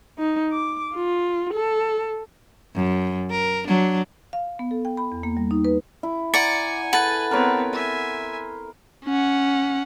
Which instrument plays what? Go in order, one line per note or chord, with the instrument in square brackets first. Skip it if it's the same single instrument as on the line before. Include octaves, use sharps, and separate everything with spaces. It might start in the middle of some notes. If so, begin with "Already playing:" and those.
[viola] D#4
D6
F4
A4
[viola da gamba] F#2
A#4
F#3 D4
[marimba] F5
B3
A4
G5
B5
E2
A#3
G3
D#4
B4
[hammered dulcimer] E4
[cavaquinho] D5 [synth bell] F#5 A#5 C#7 [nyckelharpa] G#5
[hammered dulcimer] A4 [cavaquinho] B4 [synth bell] F#5 A6
[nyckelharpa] B3 C4 [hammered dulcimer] A#4 C#5
[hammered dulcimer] C5 [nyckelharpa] E5 G#5
[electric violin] C#4 F#5